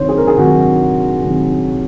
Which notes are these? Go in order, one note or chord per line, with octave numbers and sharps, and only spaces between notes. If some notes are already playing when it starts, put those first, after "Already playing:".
Already playing: C3 D#3 F#3 C5 C#5
G#4
A#4
G#4
C3 D#3 F#3 F#4
C3 D#3 F#3